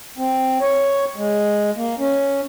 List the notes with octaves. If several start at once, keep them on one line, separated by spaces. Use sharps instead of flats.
C4
C#5
G#3
A#3
C#4